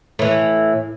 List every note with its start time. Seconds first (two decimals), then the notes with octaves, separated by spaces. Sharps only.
0.19 A2 E3